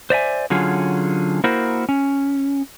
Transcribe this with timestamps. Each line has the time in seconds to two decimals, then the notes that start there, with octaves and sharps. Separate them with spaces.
0.10 C5 D5 E5 G#5
0.50 D3 F#3 C#4 F4 G#4
1.44 A#3 E4 F#4 A#4 C5
1.89 C#4